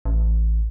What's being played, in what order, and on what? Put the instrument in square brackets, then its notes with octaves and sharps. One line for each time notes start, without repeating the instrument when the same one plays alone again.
[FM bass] A1